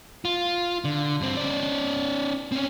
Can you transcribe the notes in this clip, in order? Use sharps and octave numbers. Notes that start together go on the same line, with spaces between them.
F4
D3
G2 C4
C#4 D5
C4 C#4